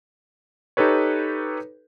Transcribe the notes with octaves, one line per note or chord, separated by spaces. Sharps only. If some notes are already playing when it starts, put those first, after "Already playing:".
D#4 G4 A4 B4 C#5